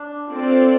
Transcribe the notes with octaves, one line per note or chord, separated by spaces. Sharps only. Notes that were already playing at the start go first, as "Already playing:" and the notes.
Already playing: D4
C4 F4 A4 D5